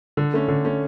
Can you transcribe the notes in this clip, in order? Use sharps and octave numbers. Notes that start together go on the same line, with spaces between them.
D3
A3 C#4
D3
A3 C#4